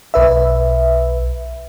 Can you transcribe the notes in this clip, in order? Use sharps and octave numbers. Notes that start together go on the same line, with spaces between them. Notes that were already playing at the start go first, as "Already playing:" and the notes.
B1 B4 E5